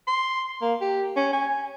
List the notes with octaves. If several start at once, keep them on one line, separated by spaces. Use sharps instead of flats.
C6
A#3
G4
C#4
G#5